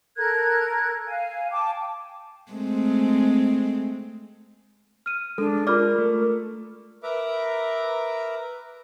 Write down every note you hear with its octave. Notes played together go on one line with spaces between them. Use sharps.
A4 A#4 F#6 G#6
F5 G#5
G5 A5 D6
G#3 A3 C4
F6 D#7
G#3 D4 A4
F4 A#4 D5 D6 F6
A3
A#4 B4 E5 A#5 D6